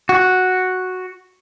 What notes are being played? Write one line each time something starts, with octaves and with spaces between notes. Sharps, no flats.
F#4